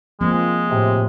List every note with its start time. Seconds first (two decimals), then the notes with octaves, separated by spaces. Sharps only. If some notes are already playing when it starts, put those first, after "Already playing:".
0.21 F3 G#3 A#3 C4
0.70 A2 C3